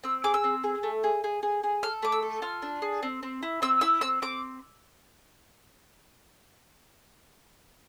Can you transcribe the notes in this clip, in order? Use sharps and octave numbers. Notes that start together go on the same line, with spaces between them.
C4 E6
G#4 D6
E6
C4
G#4
A3
G#4
G#4
G#4
G#4
A4 F6
A3 D6
E6
A4
F4 F6
D4
G#4
C4
C4
E4
C4 E6
E4 E6
C4 E6
C4 D6